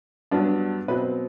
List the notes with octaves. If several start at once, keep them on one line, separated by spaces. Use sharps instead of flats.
G2 F#3 B3 D4
B2 F#3 C4 B4